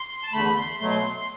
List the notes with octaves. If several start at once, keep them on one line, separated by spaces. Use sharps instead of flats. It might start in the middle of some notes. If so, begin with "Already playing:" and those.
Already playing: C6
A5
E2 D3 A3 B5
C6
B2 F#3 A3 C6
C6